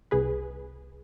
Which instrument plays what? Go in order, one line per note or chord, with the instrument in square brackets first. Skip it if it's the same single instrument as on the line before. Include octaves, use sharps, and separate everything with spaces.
[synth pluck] C2 G#4 B4